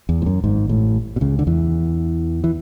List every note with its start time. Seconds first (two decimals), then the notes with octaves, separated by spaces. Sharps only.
0.09 E2
0.22 G#2
0.26 F#2
0.44 G#1 G#2
0.69 A1 A2
1.16 B2
1.21 C#2 C#3
1.39 D3
1.47 E2 E3
2.44 E3